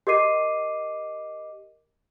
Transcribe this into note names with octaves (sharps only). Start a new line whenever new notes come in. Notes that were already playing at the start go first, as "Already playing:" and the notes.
G4 A#4 D#5 D6 C7 D#7